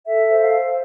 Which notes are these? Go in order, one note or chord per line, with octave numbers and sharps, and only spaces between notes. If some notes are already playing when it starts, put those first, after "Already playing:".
A4 E5
C5
F5
C5